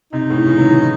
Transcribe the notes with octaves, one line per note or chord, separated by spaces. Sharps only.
C3 D#4
A2 C#3
C#3 E3
D#3 F#3
C#3 E3